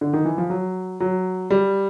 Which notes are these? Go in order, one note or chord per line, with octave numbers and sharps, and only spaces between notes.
D3
D#3
E3
F3
F#3
F#3
G3